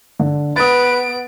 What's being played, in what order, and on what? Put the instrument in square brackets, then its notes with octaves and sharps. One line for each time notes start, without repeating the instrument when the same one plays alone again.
[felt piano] D3
[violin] B3 D7 [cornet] B4 [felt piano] D#6 A6